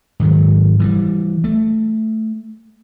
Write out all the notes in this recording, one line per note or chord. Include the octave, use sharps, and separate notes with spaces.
G#2 D#3 F#3
E3 F#3 G3
A3